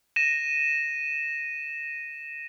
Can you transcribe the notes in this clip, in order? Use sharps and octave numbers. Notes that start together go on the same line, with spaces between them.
A#6 D#7 E7